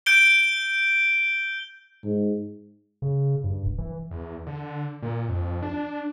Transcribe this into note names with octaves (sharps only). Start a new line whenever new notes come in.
G6 D7 G7
G#2
C#3
G2
E1
E3
E2
D3
A#2
F2
D4